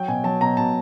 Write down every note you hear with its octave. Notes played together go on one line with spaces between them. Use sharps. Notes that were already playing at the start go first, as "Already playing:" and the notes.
Already playing: F#3 G5
B2 G#5
F#3 A5
B2 A#5
B2 A5